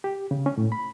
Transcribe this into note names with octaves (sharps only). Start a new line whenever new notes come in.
G4
C#3
C#4
A2
B5